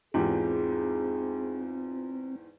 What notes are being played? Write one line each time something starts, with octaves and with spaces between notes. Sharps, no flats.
E2 G#2 C4 F4 G4 G#4